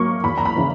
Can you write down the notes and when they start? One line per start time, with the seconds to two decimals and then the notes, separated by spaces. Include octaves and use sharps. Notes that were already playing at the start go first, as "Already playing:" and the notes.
Already playing: F#3 A#3 C#6
0.24 E2 B5
0.38 A#5
0.45 B5
0.56 C#3 E3